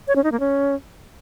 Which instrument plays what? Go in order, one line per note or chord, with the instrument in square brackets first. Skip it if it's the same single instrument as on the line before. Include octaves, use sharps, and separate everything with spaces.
[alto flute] C#5
C#4
D#4
A#3
C#4